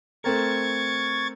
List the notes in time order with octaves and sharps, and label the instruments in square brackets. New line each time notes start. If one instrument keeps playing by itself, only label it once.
[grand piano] A3 C4 A#4 [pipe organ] C#6 G#6 A6